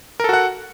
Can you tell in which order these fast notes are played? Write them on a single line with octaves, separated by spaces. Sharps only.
A#4 A4 F#4 F#5